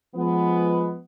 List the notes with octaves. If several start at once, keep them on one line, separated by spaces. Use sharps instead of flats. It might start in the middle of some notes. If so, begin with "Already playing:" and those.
F3 G#3 B3